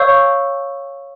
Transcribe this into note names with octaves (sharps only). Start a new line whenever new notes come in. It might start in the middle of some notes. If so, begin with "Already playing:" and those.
Already playing: C#5 F5 C#6 E6 G6